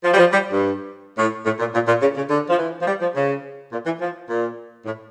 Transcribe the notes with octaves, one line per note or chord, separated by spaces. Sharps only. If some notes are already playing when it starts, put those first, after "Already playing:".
F3
G3
F3
G3
G2
A2
A2
A#2
A#2
A#2
C#3
C#3
D3
F3
E3
F3
G3
F3
C#3
A#2
E3
F3
A#2
A2